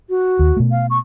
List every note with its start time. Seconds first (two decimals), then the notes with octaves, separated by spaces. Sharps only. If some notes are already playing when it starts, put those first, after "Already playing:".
0.10 F#4
0.39 D#2
0.57 B2 A3
0.71 F5
0.90 C#6